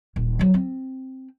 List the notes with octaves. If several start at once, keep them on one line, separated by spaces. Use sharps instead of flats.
D#1
F3 F#3
C4